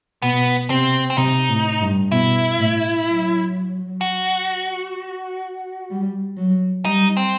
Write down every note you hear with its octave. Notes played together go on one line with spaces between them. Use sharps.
B2 B3
C3 C4
C4
C3 D#4
A2
G2
B2 E4
A2
F#3
F#4
G3
F#3
G3 D#4
C4